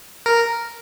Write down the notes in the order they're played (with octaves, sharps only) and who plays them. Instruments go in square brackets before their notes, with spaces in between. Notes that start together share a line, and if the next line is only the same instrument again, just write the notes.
[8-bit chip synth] A#4